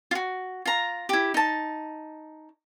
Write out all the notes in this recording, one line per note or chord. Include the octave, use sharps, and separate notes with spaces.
F4 F#4
F4 A#5
E4 G4
D#4 A5